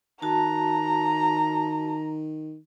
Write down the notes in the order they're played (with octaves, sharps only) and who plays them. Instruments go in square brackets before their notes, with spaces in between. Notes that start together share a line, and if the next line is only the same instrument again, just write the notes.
[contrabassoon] D#3 [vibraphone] F#4 A5 [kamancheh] A#5